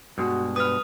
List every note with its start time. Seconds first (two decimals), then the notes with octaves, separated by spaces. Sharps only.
0.18 G2 B2 G#3 F#4
0.56 B4 D#6 F6